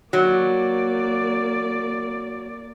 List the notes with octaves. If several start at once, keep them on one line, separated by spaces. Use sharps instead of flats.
F#3 A#3 D5